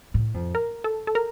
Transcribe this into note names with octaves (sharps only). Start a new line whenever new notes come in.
A2
F2
A#4
A4
A4
A#4